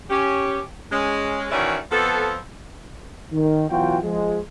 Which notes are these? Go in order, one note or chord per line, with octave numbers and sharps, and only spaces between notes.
C#4 G4
G#3 C#4
D#3 E3 C#4 F#4 D5 E5
F2 F3 B3 A4
D#3
B2 E3 F#3 F4 F#4 G5
F3 G#3